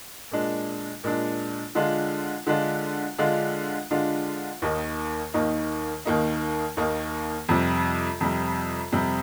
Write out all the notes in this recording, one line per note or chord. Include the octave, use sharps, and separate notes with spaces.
A#2 G#3 D4
A#2 G#3 D4
D3 G#3 D4 F4
D3 G#3 D4 F4
D3 G#3 D4 F4
D3 G#3 D4 F4
D#2 D#3 A#3 D#4
D#2 D#3 A#3 D#4
D#2 D#3 A#3 D#4
D#2 D#3 A#3 D#4
F2 C3 G3
F2 C3 G3
F2 C3 G3